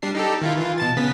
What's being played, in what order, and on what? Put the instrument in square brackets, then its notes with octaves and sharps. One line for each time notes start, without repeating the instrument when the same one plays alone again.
[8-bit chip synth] G3 D4 C7
D#4 G4 A4
D#3 E4 F4
E3 F4
B2 A5 A6
C#3 B3 B6